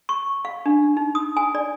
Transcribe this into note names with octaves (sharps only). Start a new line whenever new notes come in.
C#6
F5
D4
D#4
D#6
G#5
D5